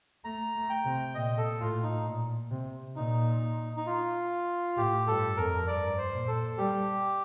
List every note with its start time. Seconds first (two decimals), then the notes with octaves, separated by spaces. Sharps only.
0.24 A3 A#5
0.55 A3
0.70 G5
0.85 C3
1.15 A#2 D#5
1.38 A4
1.60 A2 F4
1.83 D#4
2.06 A#2
2.51 C3
2.96 A#2 D#4
3.77 D#4
3.87 F4
4.77 A2 G4
5.07 G2 A4
5.37 F2 A#4
5.67 G2 D5
5.98 C5
6.13 A#2
6.28 A4
6.58 G3 G4